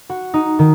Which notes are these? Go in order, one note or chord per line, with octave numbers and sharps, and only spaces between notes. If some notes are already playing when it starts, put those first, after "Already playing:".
F#4
D#4
D#3